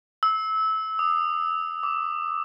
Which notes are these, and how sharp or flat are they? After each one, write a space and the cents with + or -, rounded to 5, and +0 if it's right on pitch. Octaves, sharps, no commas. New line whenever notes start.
E6 -20
D#6 -35
D6 -10